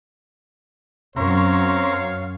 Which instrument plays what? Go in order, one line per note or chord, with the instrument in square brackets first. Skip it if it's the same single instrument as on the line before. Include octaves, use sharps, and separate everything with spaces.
[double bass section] F#2 [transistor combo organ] C4 C#4 A#4 [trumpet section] C#5 F5